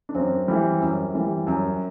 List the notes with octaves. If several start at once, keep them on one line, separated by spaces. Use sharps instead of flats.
D4
F#2 C4
E3 G3
F#2
E3 G3
F#2